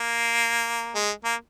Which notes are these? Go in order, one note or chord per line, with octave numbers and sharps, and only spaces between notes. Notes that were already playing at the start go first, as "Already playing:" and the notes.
Already playing: A#3
G#3
A#3